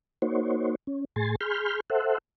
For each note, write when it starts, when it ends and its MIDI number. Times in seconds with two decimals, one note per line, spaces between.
0.22 0.75 58
0.22 0.75 63
0.22 0.75 66
0.22 0.75 72
0.22 0.75 73
0.87 1.05 61
1.16 1.35 45
1.16 1.35 68
1.16 1.35 80
1.16 1.35 84
1.16 1.35 93
1.41 1.80 68
1.41 1.80 83
1.41 1.80 84
1.41 1.80 89
1.41 1.80 91
1.90 2.18 69
1.90 2.18 72
1.90 2.18 76
1.90 2.18 78